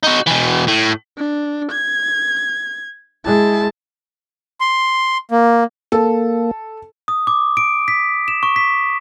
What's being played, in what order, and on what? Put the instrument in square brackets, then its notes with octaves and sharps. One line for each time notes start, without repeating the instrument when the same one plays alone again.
[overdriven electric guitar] D#4 F#4
B2 E3
A2
[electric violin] D4
G#6
[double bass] G#3 [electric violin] E4 A5
[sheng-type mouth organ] C6
A#3
[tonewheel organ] A#3 [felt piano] A4
[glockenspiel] D#6
D6
D7
B6
E7
C#6
B6